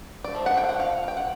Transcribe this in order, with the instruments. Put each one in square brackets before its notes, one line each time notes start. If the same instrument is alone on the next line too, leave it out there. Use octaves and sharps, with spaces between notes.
[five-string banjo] D5
F3 A3
F#5
G5
F5
F#5
F5
G5
F#5